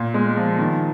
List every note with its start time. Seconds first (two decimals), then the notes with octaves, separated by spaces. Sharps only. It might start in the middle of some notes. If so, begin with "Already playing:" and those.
Already playing: A#2
0.14 G#3
0.37 F3
0.58 D#3